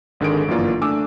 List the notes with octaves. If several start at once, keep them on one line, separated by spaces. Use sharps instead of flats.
G#1 D3 D#3 G#4 D7
G1 F#2 E3 A#3 F4 D5
A3 D4 G#5 D6 E6